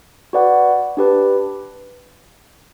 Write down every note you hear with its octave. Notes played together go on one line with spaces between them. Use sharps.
F#4 B4 D5 F#5
D4 G4 B4